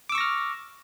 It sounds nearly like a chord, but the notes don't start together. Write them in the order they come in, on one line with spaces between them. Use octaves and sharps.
D6 E6 C#6 A#6 F6